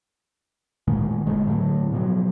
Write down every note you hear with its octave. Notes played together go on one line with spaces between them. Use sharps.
A#2 D#3 G#3 A3
G1 D3 G#3 A3
A2 D3 F#3 A3
B2 F3 F#3